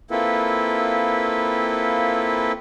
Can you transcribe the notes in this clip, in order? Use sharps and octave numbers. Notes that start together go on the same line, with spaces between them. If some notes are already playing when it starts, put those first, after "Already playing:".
A#3 C4 E4 F4 A4 B4